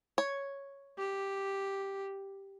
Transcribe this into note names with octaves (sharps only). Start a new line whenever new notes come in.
C#5
G4